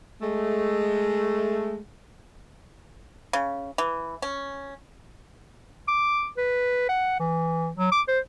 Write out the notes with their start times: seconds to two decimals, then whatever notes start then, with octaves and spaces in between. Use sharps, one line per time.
0.22 G#3 A3
3.33 C#3
3.78 E3
4.22 C#4
5.88 D6
6.37 B4
6.89 F#5
7.20 E3
7.77 F#3
7.92 D6
8.08 C5